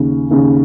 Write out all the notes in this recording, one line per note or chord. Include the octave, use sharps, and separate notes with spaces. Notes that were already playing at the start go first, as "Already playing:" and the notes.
Already playing: D#2 C#3
D#2 C#3